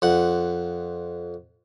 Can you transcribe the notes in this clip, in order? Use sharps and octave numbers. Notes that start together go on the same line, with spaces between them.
F2 F#5